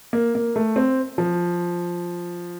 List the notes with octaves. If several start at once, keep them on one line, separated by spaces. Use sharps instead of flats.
A#3
A#3
A3
C4
F3